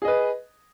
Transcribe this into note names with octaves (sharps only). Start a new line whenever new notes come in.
G#4 B4 D#5